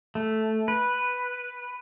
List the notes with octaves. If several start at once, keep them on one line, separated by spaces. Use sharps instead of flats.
A3
B4